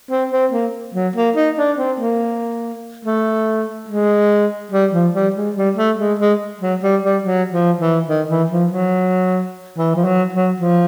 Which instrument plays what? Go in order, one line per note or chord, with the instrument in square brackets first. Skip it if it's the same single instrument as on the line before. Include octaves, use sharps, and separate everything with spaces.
[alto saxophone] C4
C4
A#3
F#3
A#3
D#4
D4
C4
A#3
A3
G#3
G3
F3
G3
G#3
G3
A3
G#3
G#3
F#3
G3
G3
F#3
F3
E3
D#3
E3
F3
F#3
E3
F3
F#3
F#3
F3